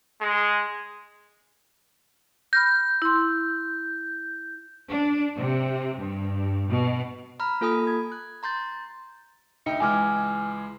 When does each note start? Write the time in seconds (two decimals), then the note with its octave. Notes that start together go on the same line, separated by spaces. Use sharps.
0.21 G#3
2.53 B5 F6 G6 A#6
3.02 E4 C6
4.90 D4
5.36 C3
5.97 G2
6.69 B2
7.40 A#5 B5 F6
7.61 A#3 F4 A4 G#5 B5 D#6
7.87 G#6
8.12 F#6
8.43 A#5 C6 G6 A6
9.66 D2 D#4 G5 C#7
9.80 C#2 E3 G#3 G#5 D6 F6